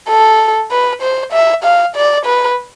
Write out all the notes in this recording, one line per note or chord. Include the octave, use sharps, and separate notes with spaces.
A4
B4
C5
E5
F5
D5
B4